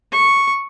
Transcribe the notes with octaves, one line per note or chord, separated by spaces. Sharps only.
C#6